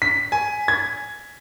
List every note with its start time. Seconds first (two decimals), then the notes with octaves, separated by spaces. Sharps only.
0.02 B6
0.32 G#5
0.68 G#6